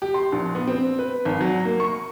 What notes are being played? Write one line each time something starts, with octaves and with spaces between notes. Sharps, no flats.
G4
C6
A#1
B3
C4
B4
G#1
F#3
A#3
C#6